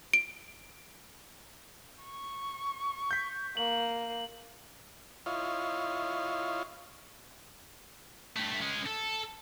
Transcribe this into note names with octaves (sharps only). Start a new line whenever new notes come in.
D7
C#6
G6 B6
A#3 F#7
E4 F4 C#5 D#5 F5
G2 A3
G#3 C#4
A4